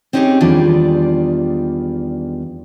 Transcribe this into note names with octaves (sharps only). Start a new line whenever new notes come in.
C4 C#4 D#4 F4 G4 G#4
E2 D#3 G3 G#3 D4 F4